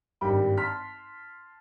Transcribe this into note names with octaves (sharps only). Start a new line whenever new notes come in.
G#1 G2 G3 G5 B5
A5 C6 F6 B6